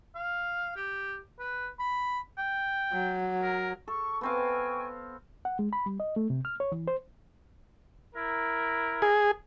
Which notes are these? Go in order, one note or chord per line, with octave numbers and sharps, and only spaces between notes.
F5
G4
B4
B5
G5
F#3
A#4
A4 C#6
B3 C4 F5 G5 G#5 C#6
F#5
G#3
B5
G3
D#5
A3
C3
F6
C#5
E3
C5
E4 A#4
G#4